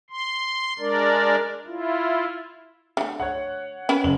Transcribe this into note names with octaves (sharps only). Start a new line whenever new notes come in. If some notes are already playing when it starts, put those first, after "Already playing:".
C6
G#3 D4 A#4 D5
E4 F4
D3 A3
C#5 F#5
C#4 A#4 B4
F#1 F#7